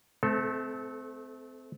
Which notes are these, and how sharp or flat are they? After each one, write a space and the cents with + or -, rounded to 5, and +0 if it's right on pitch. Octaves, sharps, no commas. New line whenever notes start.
A3 -35 C4 -25 A4 +0